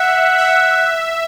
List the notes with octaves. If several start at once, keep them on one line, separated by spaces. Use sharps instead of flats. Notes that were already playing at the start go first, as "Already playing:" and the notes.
Already playing: E5 F#5
E5